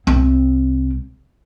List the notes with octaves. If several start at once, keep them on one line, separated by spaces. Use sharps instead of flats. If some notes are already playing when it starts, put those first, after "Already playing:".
C2 C4